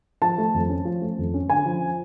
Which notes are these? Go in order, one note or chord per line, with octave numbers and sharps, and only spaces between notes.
F3 A5
A3
F2
C#4
F3
A3
F2
C#4
D3 G#5
F3